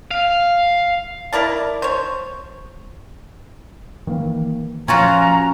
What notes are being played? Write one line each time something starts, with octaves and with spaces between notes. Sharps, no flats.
F5
E4 A#4 D5 A5
C5 C#5
D#3 E3 A#3
A#2 F3 C#4 F4 F#4 A#5